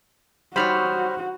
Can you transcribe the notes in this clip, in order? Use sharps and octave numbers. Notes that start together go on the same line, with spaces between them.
G3 D#4 F#4 C5 C#5 B5 F6